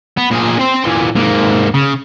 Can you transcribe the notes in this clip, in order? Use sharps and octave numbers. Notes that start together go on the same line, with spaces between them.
B3
A#2 G#4
C4 C6
A#2 E3
G#2 A#3
C#3